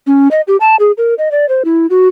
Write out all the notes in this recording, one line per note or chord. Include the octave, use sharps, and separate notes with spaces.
C#4
D#5
G4
A5
G#4
A#4
D#5
D5
C5
E4
F#4